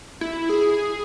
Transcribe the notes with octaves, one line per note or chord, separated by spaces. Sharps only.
E4
G#4